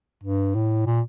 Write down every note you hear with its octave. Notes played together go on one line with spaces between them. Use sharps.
G2
A2
A#2